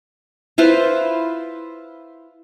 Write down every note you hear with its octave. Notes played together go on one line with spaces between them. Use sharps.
E4 F4 B4 C5